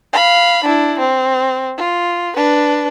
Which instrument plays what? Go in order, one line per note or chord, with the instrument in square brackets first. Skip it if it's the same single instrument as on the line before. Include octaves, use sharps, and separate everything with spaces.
[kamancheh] F5 B5
D4 E4
C4
F4
D4 B4